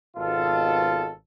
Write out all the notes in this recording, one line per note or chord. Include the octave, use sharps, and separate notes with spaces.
G#1 B2 F4 A4